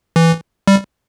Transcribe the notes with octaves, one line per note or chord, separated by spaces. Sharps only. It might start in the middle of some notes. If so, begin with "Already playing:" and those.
E3
G3